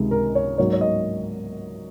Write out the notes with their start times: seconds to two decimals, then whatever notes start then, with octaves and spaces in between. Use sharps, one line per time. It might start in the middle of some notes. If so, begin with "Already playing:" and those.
Already playing: C#2 C3 D#3 G#3
0.11 A#4
0.35 C#5
0.58 G#2 F#3 A#3 C#5
0.73 C#5
0.81 D#5